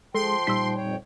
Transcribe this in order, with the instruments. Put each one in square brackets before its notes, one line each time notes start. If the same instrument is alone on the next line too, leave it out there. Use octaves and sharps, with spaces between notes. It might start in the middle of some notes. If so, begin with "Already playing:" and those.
[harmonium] F3 G5 [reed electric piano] G#3 G#4 [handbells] A4 [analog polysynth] C6
[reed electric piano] A#2 G3 D#4 [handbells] E6 B6
[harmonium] F2 C#5 G5